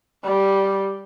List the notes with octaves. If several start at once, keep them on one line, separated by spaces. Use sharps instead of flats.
G3